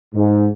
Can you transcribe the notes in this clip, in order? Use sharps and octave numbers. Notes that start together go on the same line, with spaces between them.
G#2